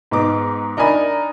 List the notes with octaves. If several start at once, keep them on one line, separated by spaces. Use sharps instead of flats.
G#2 B3 D#4 D6
D4 D#4 A#4 E5 G#5 B5